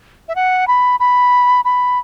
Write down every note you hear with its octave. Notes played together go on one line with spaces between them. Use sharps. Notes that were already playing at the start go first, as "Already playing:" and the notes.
E5
F#5
B5
B5
B5